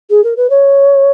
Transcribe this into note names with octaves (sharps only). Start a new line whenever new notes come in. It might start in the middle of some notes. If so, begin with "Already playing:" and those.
G#4
A#4
B4
C#5